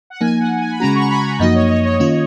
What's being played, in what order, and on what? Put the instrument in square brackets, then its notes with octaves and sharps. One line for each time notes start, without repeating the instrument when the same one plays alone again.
[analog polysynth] F#5
[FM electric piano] F3 A#3 D#4 [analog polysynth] G#5
[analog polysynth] F#5
G#5
B5
[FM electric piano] C#3 G#3 C#4 F#4 [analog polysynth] A#5
[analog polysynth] C#6
B5
A#5
[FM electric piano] F#2 F3 A#3 D#4 F#4 [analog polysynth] D#5
[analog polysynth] C#5
D#5
C#5
[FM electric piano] D#3 A#3 C#4 F4